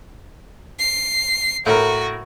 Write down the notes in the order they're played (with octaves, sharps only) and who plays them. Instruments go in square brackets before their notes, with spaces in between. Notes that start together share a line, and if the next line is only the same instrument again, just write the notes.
[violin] C7
[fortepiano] A2 A#4 [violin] F#4